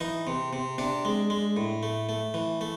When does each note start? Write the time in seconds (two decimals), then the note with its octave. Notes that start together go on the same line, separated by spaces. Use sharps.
0.01 E3 D#4
0.27 C3
0.53 C3
0.78 C3 D4
1.05 G#3
1.30 G#3
1.57 A2
1.83 A3
2.09 A3
2.34 E3
2.61 A3